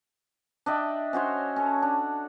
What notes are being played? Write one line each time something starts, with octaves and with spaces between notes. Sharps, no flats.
D4 D#5 E5 G5
C#4 F#4 C5 C#5
C#4 A4
D4